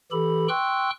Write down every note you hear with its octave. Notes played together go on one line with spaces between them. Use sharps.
E3 G4 A4 B5
G5 C6 C#6 E6 F#6